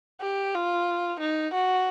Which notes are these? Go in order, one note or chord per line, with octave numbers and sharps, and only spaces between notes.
G4
F4
D#4
F#4